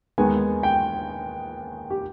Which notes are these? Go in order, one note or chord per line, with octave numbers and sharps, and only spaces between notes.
D#2 D#3 G#3 B3 G#5
G5
G4